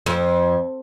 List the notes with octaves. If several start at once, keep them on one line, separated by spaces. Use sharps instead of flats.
F2